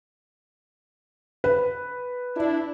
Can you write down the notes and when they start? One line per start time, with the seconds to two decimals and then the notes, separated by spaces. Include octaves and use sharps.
1.44 B4
2.37 D4 E4